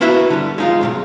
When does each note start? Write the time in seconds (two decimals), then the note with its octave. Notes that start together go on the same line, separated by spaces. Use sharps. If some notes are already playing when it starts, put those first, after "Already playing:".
0.01 A#3 B3 E4 F#4 E5
0.30 D3 G3
0.58 G#3 D#4 F4
0.81 B1 G2 C#3